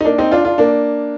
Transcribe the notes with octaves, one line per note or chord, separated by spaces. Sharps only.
D#4
A#3 D4
C4 D#4
D4 F4
D4 F4
A#3 D4